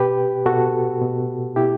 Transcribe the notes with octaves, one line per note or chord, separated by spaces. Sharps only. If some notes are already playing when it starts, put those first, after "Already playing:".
Already playing: B2 G4 B4
B2 F#4 A4
B2
B2 E4 G4